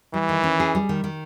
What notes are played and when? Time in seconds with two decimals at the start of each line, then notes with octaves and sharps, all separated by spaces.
0.14 E3 G3
0.29 D#3
0.44 C#4
0.60 G#4
0.75 G3
0.89 D#3
1.04 D#3